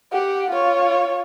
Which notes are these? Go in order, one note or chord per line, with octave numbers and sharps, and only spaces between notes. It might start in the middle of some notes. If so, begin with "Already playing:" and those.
G4 F#5
F4 C#5